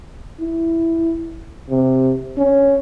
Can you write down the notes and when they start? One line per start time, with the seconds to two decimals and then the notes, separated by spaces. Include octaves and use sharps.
0.40 E4
1.70 C3
2.37 C#4